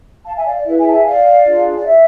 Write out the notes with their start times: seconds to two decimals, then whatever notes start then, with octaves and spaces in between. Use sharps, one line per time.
0.25 F5 A5
0.35 E5 G#5
0.45 D5 F5
0.56 D5
0.65 E4 G#4 B4 E5
0.79 E5 G#5
0.87 A5
0.92 E5 G#5
1.05 D5 F5
1.46 D4 F4 G#4
1.77 D5
1.86 E5